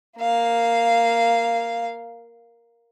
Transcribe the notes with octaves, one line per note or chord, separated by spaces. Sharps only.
A#3 F5